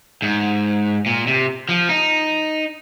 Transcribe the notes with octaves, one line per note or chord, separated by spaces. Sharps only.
G#2
A#2
C3
F3
D#4